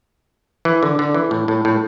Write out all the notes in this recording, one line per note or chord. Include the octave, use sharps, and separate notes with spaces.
E3
D3
D3
E3
A2
A2
A2